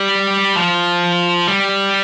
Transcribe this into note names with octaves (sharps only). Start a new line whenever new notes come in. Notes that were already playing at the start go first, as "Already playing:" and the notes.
Already playing: G3
F3
G3